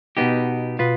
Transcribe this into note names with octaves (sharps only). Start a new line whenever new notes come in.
B2 B3 D#4 G4
B2 B3 F4 B4